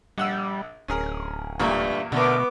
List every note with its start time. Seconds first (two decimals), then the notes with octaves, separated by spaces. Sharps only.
0.18 A#1 G3 F#5 E6
0.88 D1 C#4 G#4 A#4
1.59 E2 G2 A#2 A3 A#3
2.12 B2 D3 A3 B3 A#4 D6